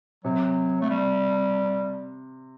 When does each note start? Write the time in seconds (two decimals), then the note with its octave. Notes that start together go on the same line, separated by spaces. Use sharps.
0.24 C3 F#3
0.81 A3
0.90 G3